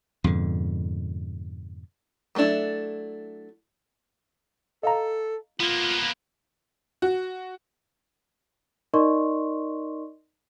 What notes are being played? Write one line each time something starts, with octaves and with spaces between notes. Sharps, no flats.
F2 G#2 B2 D3
F#3 A3 C4 D4 E4
A4 D#5 F5 A#5
A#3 B3 F4
F#4
D#4 A#4 D5 D#5 C6 C#6